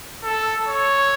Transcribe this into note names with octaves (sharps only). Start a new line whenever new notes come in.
A4
C#5